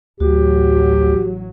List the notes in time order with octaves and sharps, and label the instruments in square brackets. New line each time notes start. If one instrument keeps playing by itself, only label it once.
[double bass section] A1 F#3 [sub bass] D2 [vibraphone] F#4 [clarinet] G4